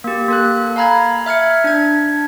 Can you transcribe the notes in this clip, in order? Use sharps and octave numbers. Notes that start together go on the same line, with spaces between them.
A#3 G4
A#3 A4 F#6
F5 G#5 A#5 B5 G#6
E5 F6 G#6 C#7
D4 G#6